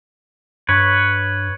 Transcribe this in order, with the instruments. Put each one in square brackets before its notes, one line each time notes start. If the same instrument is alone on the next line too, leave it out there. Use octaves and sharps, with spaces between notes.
[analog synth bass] G2 [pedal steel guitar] B4 C#5